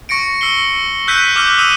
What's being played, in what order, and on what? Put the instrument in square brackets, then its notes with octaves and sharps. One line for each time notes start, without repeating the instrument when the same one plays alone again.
[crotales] C#6 A#6 C#7 D7
E6 C7 G7
E6 F#6 G6 B6 D#7
D6 E6 F6 G6
D#6 E6 D#7